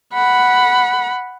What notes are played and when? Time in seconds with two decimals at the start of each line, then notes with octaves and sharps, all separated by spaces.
0.14 F#5 B5